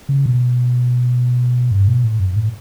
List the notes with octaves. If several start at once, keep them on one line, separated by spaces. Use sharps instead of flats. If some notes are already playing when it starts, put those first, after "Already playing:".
C#3
B2
G2
B2
A2
F#2
A2